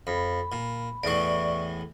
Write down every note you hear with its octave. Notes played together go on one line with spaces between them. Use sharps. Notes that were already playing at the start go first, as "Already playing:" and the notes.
F2 B5
A#2
E2 A2 E3 D5 C#6